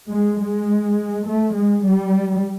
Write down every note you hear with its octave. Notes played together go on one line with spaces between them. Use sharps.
G#3
G#3
A3
G#3
G3